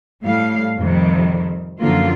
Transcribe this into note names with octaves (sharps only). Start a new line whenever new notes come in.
A2 G3 F5
F2 C3 D#3 G3
F#2 D3 F3 F#3 A#3 F4